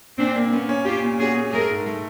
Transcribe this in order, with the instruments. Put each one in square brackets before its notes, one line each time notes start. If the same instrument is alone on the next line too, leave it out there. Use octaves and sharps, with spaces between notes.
[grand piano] A#2 [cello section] C4 D4
[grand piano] A#3
[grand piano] A#3 [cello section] B3 C#4
[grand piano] C#4
[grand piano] C#4 [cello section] F4 G4
[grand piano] A#2
[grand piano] C#4 [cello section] F#4 G#4
[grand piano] A#2
[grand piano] A3 [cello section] G#4 A#4
[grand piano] G#2
A3